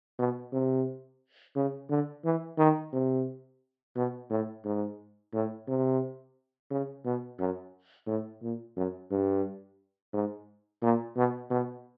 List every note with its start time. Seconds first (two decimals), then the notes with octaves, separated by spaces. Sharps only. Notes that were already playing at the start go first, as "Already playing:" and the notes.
0.19 B2
0.53 C3
1.56 C#3
1.90 D3
2.25 E3
2.58 D#3
2.93 C3
3.96 B2
4.30 A2
4.65 G#2
5.33 A2
5.68 C3
6.71 C#3
7.05 B2
7.39 F#2
8.07 A2
8.42 A#2
8.77 F#2
9.11 G2
10.13 G#2
10.82 A#2
11.17 B2
11.50 B2